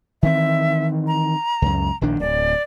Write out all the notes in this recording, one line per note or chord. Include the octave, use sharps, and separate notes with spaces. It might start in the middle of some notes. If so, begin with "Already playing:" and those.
D#3 E3 C4 E5
A#5
C#2 F#2
A#1 D#3 D4
D1 D5